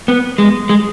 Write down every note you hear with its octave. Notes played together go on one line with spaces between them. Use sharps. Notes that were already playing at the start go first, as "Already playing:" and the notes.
B3
G#3
G#3